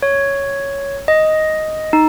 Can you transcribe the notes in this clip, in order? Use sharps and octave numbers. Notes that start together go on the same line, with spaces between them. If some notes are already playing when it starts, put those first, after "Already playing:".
C#5
D#5
D#4